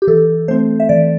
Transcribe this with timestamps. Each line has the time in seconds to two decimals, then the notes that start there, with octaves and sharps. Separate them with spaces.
0.02 G4
0.07 E3 A4
0.48 A3 C4 C5
0.80 E5
0.89 E3 D5